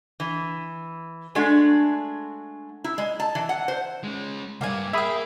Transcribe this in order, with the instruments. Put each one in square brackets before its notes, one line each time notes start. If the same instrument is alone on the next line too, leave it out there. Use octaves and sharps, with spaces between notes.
[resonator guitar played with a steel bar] E3
G#3 A3 D4 F#4 G#4
E4
G#3
A5
E3
F#5
C5
[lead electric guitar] G#3 C#4
[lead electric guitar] C#2 G2 [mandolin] A#3 D5 G#5
[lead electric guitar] A#3 [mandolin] G#4 G5 [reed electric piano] E5 B5 D#6